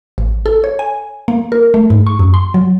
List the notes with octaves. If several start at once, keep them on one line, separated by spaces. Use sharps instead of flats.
A1
A4
C#5
G#5
A#3
A#4
A3
G#2
C#6
F#2
C6
F#3